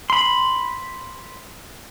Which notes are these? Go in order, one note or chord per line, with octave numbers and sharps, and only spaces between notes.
B5 C6